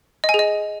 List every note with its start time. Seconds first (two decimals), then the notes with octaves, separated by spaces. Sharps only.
0.24 D#5
0.29 G#5
0.34 G#4
0.39 D#5